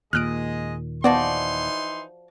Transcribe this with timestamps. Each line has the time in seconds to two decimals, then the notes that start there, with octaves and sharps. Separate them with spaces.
0.13 D#2 A#2 G#3 D#5 F6 F#6 D7
1.04 E3 F3 B3 D#4 F#4 D5 C6